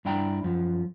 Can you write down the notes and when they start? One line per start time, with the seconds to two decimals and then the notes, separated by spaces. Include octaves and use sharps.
0.05 G2 D4 E4 G5 A#5
0.43 F#2 F3